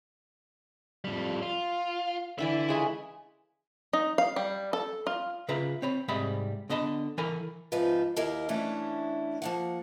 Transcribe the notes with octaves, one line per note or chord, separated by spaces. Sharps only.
F2 G3
F4
D3 E3 E4 D5 E5
C#3 G#3 G#5
D#4
F5
G3
A4
F4
C#3 F4 B4 E5 A#5 B5
C4 C#5 B5
G#2 C3 G3 G#3 E5 B5
D3 B3 D#5 A5 B5
E3 A4 A#4 G#5 B5
G#2 C3 F3 D#4 F4 B4
D#2 E4 G4 A#4 D#5 F5
E3 A3 C#4 D4 E4
F3 A#3 F#5